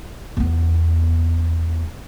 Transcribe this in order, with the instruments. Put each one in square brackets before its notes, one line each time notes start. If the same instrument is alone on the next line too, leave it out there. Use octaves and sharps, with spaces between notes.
[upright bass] E2 B3